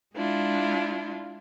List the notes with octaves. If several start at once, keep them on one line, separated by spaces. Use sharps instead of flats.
G#3 D4 E4 F4